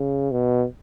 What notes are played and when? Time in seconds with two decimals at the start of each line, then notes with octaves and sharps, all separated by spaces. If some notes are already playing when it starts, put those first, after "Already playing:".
Already playing: C#3
0.31 B2